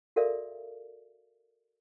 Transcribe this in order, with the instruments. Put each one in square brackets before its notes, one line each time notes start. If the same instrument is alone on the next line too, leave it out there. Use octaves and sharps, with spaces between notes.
[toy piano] F#4 A4 A#4 D5 E5 F5